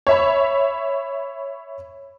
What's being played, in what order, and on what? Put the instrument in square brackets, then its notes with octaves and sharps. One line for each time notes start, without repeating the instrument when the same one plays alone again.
[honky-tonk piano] C#5 E5 B5